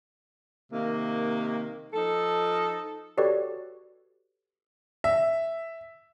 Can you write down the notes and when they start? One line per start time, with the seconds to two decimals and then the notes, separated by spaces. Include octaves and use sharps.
0.70 C3 D#3 A#3
1.93 F3 D#4 A4
3.18 F#4 G4 A4 B4 C#5 D5
5.04 E5